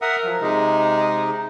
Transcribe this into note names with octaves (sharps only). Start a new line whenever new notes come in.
A#4 E5 F#5 D#6
F3 F#3
C3 G#3 D#4